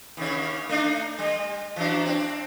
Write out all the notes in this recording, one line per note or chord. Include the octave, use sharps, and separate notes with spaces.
D#2 C#3 C#5
A3 D4 D#4
G3
E3 F#3 D4
C4 D4